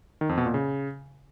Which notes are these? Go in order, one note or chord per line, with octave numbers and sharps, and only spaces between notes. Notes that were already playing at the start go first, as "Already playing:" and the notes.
D#3
F2
B2
A#2
C#3